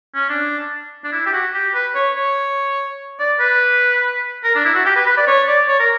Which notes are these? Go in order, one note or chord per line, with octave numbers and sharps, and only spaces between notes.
C#4
D4
D4
E4
G4
F#4
G4
B4
C#5
C#5
D5
B4
A#4
D4
E4
F#4
G4
B4
B4
D5
C#5
D5
C#5
A#4